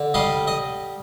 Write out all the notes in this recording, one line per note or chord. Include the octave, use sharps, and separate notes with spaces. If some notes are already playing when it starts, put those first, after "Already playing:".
Already playing: D3
G3 D#5 F5
D#5